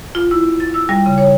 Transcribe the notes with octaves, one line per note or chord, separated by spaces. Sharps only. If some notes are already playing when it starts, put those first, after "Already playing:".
F4
E4
A6
E6
G3
C#3
C#5